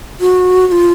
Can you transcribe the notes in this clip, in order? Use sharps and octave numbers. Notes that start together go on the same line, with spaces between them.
F#4
F#4
F4